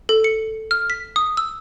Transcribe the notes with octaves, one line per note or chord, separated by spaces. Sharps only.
A4
C#7
F6
B6
D#6
E6